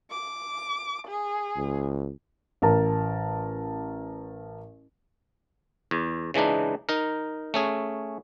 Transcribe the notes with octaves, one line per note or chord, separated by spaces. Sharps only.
D6
G#4
C#2
A1 A#4 A5
E2
C#3 E3 G#3 D4 D#4
D#4 A#4
A3 C#4 G#4